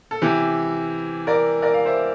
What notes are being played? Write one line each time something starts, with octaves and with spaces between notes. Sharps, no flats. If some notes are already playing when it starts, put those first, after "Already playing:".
A4
C3 E3 E4 G4
A#4 D5
A#4 D5
F5
C5 E5